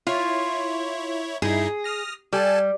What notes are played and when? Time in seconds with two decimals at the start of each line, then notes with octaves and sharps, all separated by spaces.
0.07 E4 F4 C#5
1.42 G2 D#4 E4 G#4
1.84 D#6 F6 A#6
2.33 G3 A4 G#5 A5